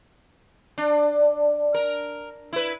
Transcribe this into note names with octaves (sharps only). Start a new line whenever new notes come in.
D4
A#4
E4 B4